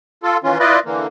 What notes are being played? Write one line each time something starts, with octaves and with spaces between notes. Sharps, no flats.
F4 A4
D#3 E3 C#4 F4
E4 F4 B4 D5 D#5
D3 E3 A#3